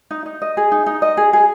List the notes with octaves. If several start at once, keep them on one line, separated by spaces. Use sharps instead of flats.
D#4
D#4
D#5
G#4
D#4
D#4
D#5
G#4
G#4